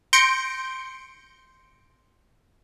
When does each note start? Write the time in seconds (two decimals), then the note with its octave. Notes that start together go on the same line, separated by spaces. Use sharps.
0.13 C6 G6 A#6 C#7 D7